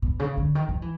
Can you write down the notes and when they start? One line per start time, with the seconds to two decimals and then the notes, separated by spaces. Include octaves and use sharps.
0.02 B2
0.19 C#3
0.37 D3
0.55 D#3
0.69 F3
0.82 E3